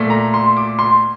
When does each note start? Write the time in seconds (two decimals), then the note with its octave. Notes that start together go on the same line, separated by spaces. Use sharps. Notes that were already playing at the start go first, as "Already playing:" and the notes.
Already playing: A#2 A3
0.10 A#5
0.34 C6
0.57 D6
0.79 C6